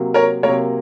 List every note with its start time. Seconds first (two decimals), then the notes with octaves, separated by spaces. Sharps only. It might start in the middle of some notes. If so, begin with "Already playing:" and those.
Already playing: C3 F#3 A#3
0.14 A#4 C#5
0.43 C3 F#3 A#3 A#4 C#5